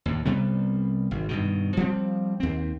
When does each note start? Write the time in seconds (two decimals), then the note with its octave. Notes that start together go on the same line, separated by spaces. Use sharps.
0.06 D#2 A2
0.25 C2 C3 G3 B3
1.11 G#1
1.29 G2 B2 D#3
1.77 F3 G3 C4
2.40 D#2 C4